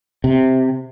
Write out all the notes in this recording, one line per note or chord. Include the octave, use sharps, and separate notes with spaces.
C3